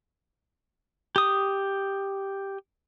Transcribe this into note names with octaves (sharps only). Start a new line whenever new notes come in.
G4 D#6